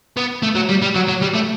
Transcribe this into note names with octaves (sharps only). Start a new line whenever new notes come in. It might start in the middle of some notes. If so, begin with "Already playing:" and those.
B3
A3
F#3
G3
G3
F#3
F#3
G3
A3